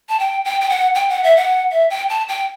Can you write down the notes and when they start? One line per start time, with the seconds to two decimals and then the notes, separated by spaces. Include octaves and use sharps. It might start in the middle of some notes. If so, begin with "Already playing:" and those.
0.09 A5
0.20 G5
0.45 G5
0.61 G5
0.70 F#5
0.95 G5
1.09 F#5
1.24 E5
1.37 F#5
1.71 E5
1.90 G5
2.10 A5
2.28 G5